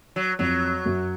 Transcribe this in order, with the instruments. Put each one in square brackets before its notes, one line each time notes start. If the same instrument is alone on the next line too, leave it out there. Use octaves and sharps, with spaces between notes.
[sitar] F#3
[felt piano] F2 [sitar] F#3
[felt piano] F#2